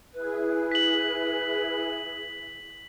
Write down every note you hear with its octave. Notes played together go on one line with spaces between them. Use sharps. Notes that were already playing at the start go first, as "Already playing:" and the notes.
E4 G#4 B4
B6 F#7